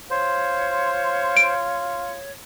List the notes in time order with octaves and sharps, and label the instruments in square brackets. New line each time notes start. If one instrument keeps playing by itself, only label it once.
[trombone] F4 [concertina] C5 [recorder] C#5
[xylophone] D7